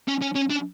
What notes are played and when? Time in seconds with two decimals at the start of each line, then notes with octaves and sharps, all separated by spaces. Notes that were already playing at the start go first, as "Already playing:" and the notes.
0.08 C#4
0.22 C#4
0.36 C#4
0.50 D4